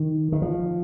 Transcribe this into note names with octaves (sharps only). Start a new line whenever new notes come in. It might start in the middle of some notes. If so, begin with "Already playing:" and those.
Already playing: D#3
D#3
F3